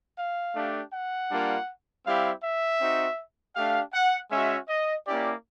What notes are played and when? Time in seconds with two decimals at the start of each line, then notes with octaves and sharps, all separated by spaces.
0.18 F5
0.55 A3 D4 G4
0.92 F#5
1.30 G3 A#3 D4 F4
2.05 G3 C4 E4 G4 F5
2.43 E5
2.81 C4 D#4 F#4
3.55 A3 D4 G4 F5
3.93 F#5
4.30 G#3 C#4 F#4 E5
4.69 D#5
5.06 A#3 C#4 E4 G4 D5